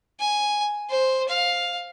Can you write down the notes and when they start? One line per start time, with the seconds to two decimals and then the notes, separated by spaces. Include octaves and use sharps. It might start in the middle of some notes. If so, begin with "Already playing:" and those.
0.20 G#5
0.91 C5
1.29 F5